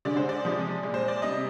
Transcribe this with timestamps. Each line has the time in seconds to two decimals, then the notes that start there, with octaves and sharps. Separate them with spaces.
0.05 D3 G#3 D5
0.17 C5
0.29 D5
0.44 C3 F3 G#3
0.83 A#2 G#3
0.94 C5
1.08 D5
1.22 C3 G3 D#5